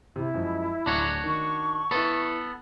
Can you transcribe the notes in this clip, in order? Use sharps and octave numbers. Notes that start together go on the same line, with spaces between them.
C3 E4
F#2 F3 G#3
D1 D4 F#4 C#5
D#3 C#6
B3 E4 A4 B4